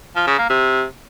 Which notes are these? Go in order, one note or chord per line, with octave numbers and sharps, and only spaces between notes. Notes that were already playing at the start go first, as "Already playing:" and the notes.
F3
C#3
A#3
C3